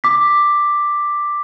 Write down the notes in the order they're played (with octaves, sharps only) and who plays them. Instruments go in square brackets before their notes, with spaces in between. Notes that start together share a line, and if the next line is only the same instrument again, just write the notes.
[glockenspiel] D6 B6